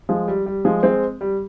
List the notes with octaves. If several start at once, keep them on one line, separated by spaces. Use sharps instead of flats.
F3 G#3
G3
G3
F3 G#3
G#3 C4
G3